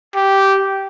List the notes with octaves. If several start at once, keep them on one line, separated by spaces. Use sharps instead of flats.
G4